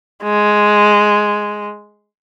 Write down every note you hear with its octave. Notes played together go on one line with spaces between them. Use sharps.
G#3